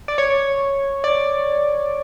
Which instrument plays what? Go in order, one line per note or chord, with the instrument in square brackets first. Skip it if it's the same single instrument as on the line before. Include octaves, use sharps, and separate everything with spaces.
[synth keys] D5
C#5
D5